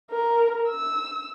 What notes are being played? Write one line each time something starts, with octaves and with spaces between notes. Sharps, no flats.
A#4
E6